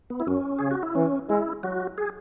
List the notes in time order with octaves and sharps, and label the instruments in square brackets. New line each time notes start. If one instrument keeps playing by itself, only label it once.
[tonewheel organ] B3
E4
[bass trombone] F#2 [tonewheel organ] C#4
[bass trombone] C#3 [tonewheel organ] G#4
[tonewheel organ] F#4
E4
[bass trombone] E3 [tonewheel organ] C#4
[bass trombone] G#3 [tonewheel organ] E4
[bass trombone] F#3 [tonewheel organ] F#4
[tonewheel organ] G#4